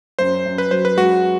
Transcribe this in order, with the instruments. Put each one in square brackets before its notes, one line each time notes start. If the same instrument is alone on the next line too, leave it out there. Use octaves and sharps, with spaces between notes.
[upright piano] F#2 [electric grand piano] C5
[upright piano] F#2
[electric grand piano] B4
[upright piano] F#3 [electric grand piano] C5
[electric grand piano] B4
[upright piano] G#3 [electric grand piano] F#4